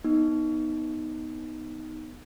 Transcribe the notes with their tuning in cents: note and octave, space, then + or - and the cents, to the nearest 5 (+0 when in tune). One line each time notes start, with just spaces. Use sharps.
B3 +0 D#4 +0